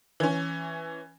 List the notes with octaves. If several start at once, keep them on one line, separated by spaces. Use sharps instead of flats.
E3 C#4